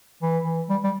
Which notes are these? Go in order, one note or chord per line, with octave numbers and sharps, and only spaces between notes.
E3
E3
G3
G3